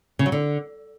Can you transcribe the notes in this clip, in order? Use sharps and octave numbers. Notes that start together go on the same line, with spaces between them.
C#3
F#3
D3